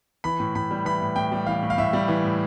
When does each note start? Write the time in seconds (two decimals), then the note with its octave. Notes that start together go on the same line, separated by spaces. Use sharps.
0.24 E3 B5
0.40 A2
0.55 A2 B5
0.71 G3
0.85 E3 B5
1.01 A2
1.16 A2 G5
1.32 G3
1.46 E3 F5
1.62 A2
1.70 F5
1.78 A2 E5
1.93 G3
2.08 E3
2.24 A2